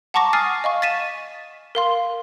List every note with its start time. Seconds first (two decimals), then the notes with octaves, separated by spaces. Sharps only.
0.14 F#5 A5 A#5 C#6 D6 A#6
0.33 G#5 D#6 F6 A6 C7
0.64 D#5 F5 C#6
0.82 A6 B6 D#7 E7
1.75 A#4 F5 C6